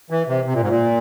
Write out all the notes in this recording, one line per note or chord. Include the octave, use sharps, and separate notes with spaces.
E3
C3
C3
A#2
G#2
A#2